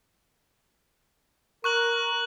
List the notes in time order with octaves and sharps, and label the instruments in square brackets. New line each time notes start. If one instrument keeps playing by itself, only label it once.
[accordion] A#4 [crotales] C#6 F#6 F#7